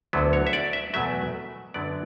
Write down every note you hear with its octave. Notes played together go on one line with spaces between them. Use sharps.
D2 D3 F#3 B3
C#5
E5
D5
E5
E2 B2 F#3 A3 E5
F#2 D3 F#3 B3 D5